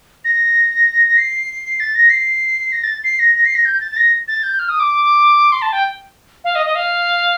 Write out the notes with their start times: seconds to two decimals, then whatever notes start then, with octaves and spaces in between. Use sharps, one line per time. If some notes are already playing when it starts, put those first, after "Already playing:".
0.25 A#6
1.18 C7
1.80 A6
1.95 A#6
2.10 C7
2.72 A#6
2.83 A6
3.04 C7
3.19 A#6
3.35 A#6
3.46 C7
3.55 A#6
3.65 G6
3.81 A6
3.91 A6
3.97 A#6
4.28 A6
4.43 G6
4.59 F6
4.69 D#6
4.80 D6
5.52 C6
5.62 A5
5.73 G5
6.44 F5
6.55 D#5
6.66 D#5
6.75 F5